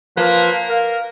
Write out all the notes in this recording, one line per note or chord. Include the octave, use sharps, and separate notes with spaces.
F3 A#3 B4
A#4 F5